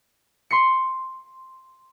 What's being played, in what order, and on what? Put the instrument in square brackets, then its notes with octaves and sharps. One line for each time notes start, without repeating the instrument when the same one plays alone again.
[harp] C6 C7 C#7